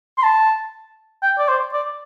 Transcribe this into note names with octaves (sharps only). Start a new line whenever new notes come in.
C6
A5
G5
D5
C5
D5